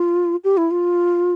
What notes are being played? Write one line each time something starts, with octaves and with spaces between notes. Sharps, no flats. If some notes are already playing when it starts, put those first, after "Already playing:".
Already playing: F4
G4
E4
F4